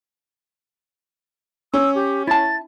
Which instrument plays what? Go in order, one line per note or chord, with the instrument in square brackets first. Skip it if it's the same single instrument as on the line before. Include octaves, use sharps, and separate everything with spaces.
[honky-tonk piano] C#4 [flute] E6
[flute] G4
[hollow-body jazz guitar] E4 A5 [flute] A6